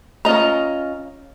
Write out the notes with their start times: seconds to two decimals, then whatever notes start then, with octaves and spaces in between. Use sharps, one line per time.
0.25 C#4 F4 D#5 A#5